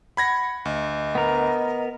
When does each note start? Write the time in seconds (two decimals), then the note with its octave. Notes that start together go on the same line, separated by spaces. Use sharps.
0.17 F#5 B5 G#6 A#6
0.65 D2 D#5
1.15 B3 A#4